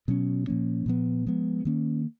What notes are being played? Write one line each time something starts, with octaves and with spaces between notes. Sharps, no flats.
B2 F#3 C#4
A#2 F3 A#3 C#4
A#2 F3 B3
F3 G#3 B3
D#3 A#3 C#4